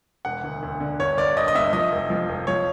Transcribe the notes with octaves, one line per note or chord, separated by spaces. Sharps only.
E1 F#5
D2
D2
D3
G1 C#5
G1 D5
G1 D#5
D#5
G2 E5
F3 D#5
F1
F3
F1
F3 C#5